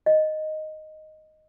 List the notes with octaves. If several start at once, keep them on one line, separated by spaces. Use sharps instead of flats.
D#5